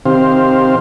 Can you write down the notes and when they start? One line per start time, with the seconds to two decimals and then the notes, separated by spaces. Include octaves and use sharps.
0.05 C3 D#3 C4 G4 C5 F5